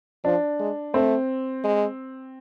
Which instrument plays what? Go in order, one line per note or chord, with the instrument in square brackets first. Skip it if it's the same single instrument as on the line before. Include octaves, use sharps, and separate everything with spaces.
[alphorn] F3 [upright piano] D4
[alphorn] G#3
[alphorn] A3 [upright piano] C4
[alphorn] G#3